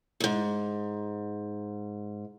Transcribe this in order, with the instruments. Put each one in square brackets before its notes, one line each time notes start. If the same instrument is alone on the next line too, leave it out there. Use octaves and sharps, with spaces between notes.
[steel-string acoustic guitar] E2 G#2